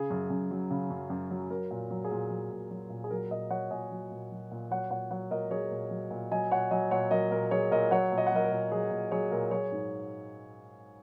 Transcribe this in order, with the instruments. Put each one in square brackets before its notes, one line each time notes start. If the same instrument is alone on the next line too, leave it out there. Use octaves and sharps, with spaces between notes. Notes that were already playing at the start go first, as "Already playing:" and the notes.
Already playing: [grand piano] C#3 G#4
F#2
F#2
F#3
C#3
F#2
F#2
F#3
F#3 A#4
A#2
F#3
G#4
A#2
F#3
A#2
F#3
A#2
G#4
F#3 A#4
A#2 A#4 D#5
F#3 C#5 F#5
A#2 D#5 G#5
F#3
A#2
F#3
A#2
F#3 C#5 F#5
A#2 C#5 F#5
F#3 C#5 F#5
A#2 A#4 D#5
F#3 G#4 C#5
A#2
F#3
A#2
F#3 D#5 G#5
A#2 C#5 F#5
F#3 D#5 G#5
A#2 C#5 F#5
F#3 A#4 D#5
A#2 A#4
F#3 G#4 C#5
A#2 A#4 D#5
F#3 C#5 F#5
A#2
D#5
F#5
F#3 A#4 D#5
A#4
A#2
F#3 G#4
A#2
F#3 G#4 C#5
A#2 A#4
F#3 G#4 C#5
G#2